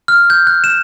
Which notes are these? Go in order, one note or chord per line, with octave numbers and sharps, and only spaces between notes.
F6
G6
F#6
E7